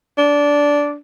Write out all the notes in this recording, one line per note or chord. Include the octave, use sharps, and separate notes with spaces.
D4